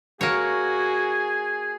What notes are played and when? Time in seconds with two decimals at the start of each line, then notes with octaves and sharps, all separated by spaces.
0.21 A#3 F#4 G#4 C#5